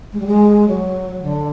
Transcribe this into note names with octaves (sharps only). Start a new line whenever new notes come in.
G#3
G3
G#3
F#3
D3